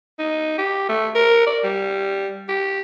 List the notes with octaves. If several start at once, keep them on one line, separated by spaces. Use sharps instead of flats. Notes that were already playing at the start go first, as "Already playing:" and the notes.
D#4
G4
A3
A#4
D5
G3
G4